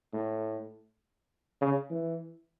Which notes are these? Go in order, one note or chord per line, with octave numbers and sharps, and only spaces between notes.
A2
C#3
E3